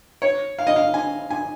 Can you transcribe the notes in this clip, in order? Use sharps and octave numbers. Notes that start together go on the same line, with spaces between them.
C#5
F5
D#5
F5
G#5
G#5